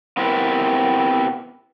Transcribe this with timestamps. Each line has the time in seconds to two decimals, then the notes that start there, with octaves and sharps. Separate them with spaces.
0.17 B3 C4 E4 G4 A#4 B4